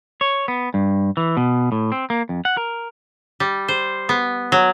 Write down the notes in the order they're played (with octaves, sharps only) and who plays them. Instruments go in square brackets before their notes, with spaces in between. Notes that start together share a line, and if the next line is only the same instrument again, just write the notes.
[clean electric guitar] C#5
B3
G2
E3
B2
A2
C4
A#3
F2
F#5
A#4
[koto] G3
C5
B3
F#3